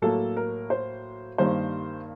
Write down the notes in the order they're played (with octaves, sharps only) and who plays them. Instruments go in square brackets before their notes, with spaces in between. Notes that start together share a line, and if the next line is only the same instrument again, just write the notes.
[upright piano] A2 F#3 A#3 A4
A#4
C5
G2 D#3 G3 A#3 C5